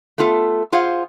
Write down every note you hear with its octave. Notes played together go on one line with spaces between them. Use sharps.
A3 B3 F4 A4
F4 G#4 C5 F5 F#5